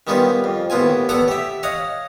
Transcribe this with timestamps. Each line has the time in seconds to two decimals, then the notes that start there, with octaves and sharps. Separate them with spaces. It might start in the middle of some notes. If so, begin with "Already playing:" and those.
0.07 D#3 G3 B3 C#4 F4
0.44 F2
0.70 D#2 A2 B3 F4 G#5
1.09 B3 A4 C#5 D5 F#5
1.28 G4 E5
1.63 C#5 D#5 F5 F#5